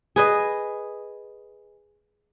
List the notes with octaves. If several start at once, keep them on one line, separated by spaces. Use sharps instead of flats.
G#4 B4 D#5